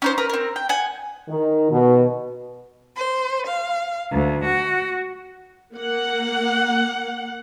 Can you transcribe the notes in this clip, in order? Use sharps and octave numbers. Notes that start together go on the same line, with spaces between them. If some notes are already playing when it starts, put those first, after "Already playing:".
C#4 D#4 C5
A#4 B4 A#5
C4 A#4
G5
F#5 G#5
D#3
B2
C5
F5
D2
F#4
A#3 F#5